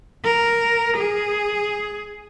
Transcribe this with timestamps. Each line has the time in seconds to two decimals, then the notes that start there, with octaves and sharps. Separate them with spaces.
0.25 A#4
0.97 G#4